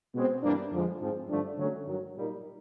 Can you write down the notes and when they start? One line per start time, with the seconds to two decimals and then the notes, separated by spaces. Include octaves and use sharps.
0.14 B2 G#3 C4
0.43 G2 E3 G3 A#3 D4
0.72 F2 D3 F3 G#3
1.00 G#2 F3 G#3 C4
1.29 G2 D3 F3 A3 D4
1.58 D3 F#3 A3 C#4
1.87 G2 D#3 F#3
2.16 A#2 G3 A#3 D#4